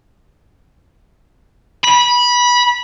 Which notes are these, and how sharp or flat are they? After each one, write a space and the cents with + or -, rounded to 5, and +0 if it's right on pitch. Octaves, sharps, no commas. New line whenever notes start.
B5 -20